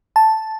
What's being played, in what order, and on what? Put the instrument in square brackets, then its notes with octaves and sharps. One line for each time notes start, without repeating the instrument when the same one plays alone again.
[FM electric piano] A5